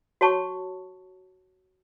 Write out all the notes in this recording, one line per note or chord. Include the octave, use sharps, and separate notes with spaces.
F#4 C#5 A5 C#6